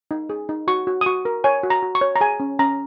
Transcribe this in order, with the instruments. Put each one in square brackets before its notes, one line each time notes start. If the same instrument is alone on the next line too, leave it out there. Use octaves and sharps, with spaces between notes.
[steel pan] D#4
G#4
D#4
F#4 C#6
F#4
D#6
F#4 C#6
A#4
C#5 G#5
F#4
A#5
F#4
C#6
C#5
A#5
G#4 G#5
C#4
C#4 A#5